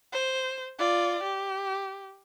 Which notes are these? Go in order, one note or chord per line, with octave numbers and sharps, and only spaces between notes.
C5
F4 D5
G4